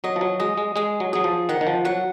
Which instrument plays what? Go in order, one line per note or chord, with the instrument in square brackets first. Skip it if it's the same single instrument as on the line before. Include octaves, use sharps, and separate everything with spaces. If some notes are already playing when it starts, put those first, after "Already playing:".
[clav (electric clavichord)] F#3 [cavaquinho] D#5
[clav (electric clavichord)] F3
F#3
[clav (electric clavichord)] G#3 [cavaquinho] D#5
[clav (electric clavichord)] G#3
[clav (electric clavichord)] G#3 [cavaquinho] G#4
[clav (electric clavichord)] F#3
[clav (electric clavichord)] F#3 [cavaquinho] G#4
[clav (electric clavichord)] F3
[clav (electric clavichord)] D#3 [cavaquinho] F#5
[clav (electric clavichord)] D#3
F3
[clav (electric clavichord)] F#3 [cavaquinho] F#5